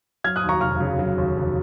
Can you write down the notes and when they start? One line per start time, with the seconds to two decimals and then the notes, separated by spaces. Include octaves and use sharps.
0.24 F#3 F6 G#6
0.36 D#6 F#6
0.43 D#2
0.49 A#5 C#6
0.61 F1 C#6 F6
0.80 C#3
0.99 F#3
1.18 D#2
1.36 F1